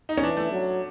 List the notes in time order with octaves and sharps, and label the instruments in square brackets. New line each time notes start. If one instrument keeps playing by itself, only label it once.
[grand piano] D#4
C#4
[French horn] E3 [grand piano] D4
[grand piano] A3
[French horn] F#3